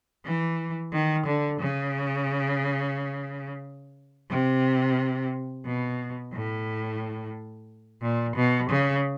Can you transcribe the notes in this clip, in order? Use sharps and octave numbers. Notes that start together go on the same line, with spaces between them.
E3
D#3
D3
C#3
C3
B2
A2
A#2
B2
C#3